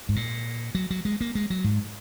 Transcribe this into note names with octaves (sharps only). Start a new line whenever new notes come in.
G#2
A#2
F#3
F#3
G#3
A#3
G#3
F#3
G#2